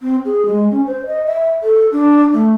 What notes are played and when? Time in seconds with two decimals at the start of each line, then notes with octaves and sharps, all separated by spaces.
0.01 C4
0.25 G#4
0.46 G#3
0.71 C#4
0.87 C5
1.06 D#5
1.26 E5
1.63 A4
1.92 D4
2.33 A3